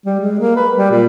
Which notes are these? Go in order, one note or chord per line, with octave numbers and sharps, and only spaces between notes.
G3
G#3
A#3
B4
G3
A#2